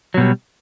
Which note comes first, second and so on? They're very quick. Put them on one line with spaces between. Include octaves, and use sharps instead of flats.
F#3 B2 G3